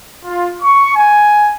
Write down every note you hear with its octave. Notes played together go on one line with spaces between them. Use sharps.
F4
C#6
G#5